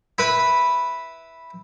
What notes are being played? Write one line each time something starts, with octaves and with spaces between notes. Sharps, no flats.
E4 B4 B5